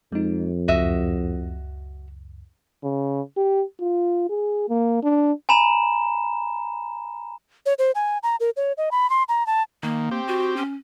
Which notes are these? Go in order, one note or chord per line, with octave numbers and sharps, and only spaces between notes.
F2 G#3 D#4
C#2 F#2 F#4 D#5 E5
C#3
G4
F4
G#4
A#3
D4
G#5 A#5 B5 E7
C#5
C5
G#5
A#5
A#4
C#5
D#5
B5
C6
A#5
A5
D#3 A#3
C4 G4
F#4
C#4